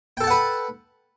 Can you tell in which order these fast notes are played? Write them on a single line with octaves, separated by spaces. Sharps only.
G5 A4 A5 F#5 B4